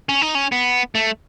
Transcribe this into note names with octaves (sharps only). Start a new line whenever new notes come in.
C#4
D#4
C#4
B3
A3